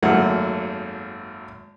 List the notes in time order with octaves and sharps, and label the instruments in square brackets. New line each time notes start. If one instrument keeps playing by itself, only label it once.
[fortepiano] G#1 F#2 A3 A#3 F#5